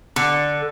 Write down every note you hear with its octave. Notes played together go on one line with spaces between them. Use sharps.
D3